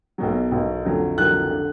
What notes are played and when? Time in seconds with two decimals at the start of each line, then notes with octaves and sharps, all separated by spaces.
0.18 B1 B2 F#3
0.52 B1 B2 F#3
0.85 F2 D3 F#3
1.17 F2 D3 F#3 F#6
1.51 D3